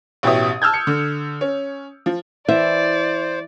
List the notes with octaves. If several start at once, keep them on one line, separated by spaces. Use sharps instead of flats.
A1 B2 G4 C#5 E5 D#6
A5 E6 F6 G6 G#6
C#7
D3
C#4
F3
E3 C5 D5 E5